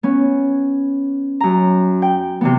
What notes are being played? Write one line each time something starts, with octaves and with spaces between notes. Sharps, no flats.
B3 C#4
F#2 A#5
G5
C3 E3 B3